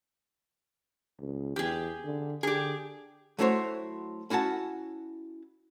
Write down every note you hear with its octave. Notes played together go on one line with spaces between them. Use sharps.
C#2
E2 G4 G#4
D3
D3 G4 G#4
F#3 A3 E4 F#4 C5 C#5
C#4 E4 F#4 F#5 A5